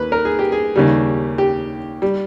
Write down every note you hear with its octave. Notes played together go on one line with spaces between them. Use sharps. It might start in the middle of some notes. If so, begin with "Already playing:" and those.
Already playing: D#2 B4
A#4
G#4
G4
G#4
D#2 C#3 G3
G4
G3